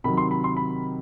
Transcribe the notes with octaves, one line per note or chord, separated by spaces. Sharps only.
C3 D#3 F#3 B5
C6
B5
C6
B5